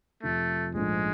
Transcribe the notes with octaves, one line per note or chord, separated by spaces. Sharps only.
F2 C3 F3 A3
A#1 G#2 F3 G#3 A3 D4